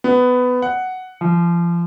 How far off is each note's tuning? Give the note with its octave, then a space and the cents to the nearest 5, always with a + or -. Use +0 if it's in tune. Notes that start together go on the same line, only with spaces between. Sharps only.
B3 +15
F#5 +5
F3 -30